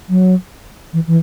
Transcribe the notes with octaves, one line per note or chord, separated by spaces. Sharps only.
F#3
E3
E3